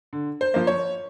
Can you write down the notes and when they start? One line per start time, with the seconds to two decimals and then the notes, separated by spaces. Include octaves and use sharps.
0.13 D3
0.41 C5
0.54 F3 A#3
0.67 C#5